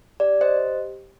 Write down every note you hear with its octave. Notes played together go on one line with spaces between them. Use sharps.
G4 D5
C5 D#5